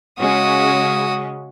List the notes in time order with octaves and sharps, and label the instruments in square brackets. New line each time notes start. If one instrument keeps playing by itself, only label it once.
[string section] C#3 G#3 C#4 [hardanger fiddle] F#4 D#6